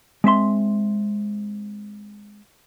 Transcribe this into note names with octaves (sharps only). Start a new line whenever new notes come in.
G#3 C4 E5 C6